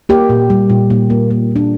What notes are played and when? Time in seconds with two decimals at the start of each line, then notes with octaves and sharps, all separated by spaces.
0.09 A#3 G4
0.29 A#2
0.50 G3
0.70 A#2
0.90 A#2
1.10 A#3
1.30 A#3
1.51 A#3 D4